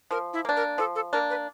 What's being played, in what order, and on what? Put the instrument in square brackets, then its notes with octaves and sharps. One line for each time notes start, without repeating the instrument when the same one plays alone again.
[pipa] F3 [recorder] A#4
[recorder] E4
[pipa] A#3 D4
[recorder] A#4
[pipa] F3 [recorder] A4
[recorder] A4
[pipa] A#3 D4 [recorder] A#4
[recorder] B4